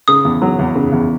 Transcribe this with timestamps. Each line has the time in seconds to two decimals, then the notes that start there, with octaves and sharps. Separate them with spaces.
0.08 C#3 D#6
0.25 E2
0.42 F#3
0.59 E2
0.75 C#3
0.92 E2